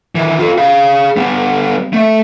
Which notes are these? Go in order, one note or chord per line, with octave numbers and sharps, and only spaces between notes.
D#3 E3
F4 A4
G#4 F5
G3 B3
A3 E5